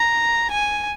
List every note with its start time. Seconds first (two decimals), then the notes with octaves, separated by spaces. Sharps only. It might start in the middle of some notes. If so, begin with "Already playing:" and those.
Already playing: A#5
0.51 G#5